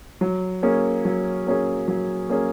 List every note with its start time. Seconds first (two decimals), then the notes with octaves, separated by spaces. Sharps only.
0.21 F#3
0.63 A#3 C#4 G#4
1.05 F#3
1.46 A#3 C#4 G#4
1.88 F#3
2.29 A#3 C#4 G#4